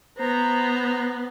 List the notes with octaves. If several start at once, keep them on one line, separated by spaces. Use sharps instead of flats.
B3 C5 A#5